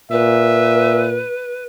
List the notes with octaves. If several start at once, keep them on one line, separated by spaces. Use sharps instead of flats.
A#2 B4 E5